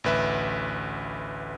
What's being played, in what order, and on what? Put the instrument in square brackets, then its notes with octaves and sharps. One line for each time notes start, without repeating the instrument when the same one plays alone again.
[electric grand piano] A1 D2 B4 E5